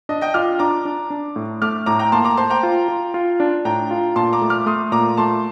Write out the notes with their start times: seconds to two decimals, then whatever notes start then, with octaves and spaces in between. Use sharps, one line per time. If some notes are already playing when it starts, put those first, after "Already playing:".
0.09 D4 D#5
0.21 D#5 G5
0.34 F4 D6 F6
0.59 D4 A#5 D6
0.85 D4
1.11 D4
1.36 A2
1.62 A3 D6 F6
1.86 A2 A#5 D6
1.99 G5 A#5
2.12 A#3 A5 C6
2.24 A#5 D6
2.37 C5 A5 C6
2.50 G5 A#5
2.63 F4
2.88 F4
3.14 F4
3.40 D4
3.65 A2 G5 A#5
3.91 F4
4.16 A#2 A5 C6
4.33 A#5 D6
4.42 A3
4.50 D6 F6
4.66 A3 C6 D#6
4.92 A#2 A#5 D6
5.17 A3 A5 C6